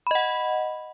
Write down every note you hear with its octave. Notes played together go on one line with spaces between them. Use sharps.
D#5 F#5 B5